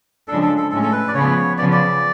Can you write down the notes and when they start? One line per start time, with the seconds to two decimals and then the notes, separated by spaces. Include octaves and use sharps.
0.28 C#3 F3 G#3 D4 A4
0.42 A4
0.58 A4
0.71 A2 G#3 C#4 A4
0.83 A4
0.93 B4
1.08 D5
1.14 C#3 F3 B3 C#5
1.58 C#3 F3 B3 D5
1.73 D5